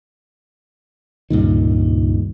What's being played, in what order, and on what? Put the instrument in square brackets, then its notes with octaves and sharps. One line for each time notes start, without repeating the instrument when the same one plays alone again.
[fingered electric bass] C#2 G2 A#2 D#3